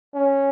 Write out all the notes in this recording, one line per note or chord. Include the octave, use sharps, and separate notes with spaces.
C#4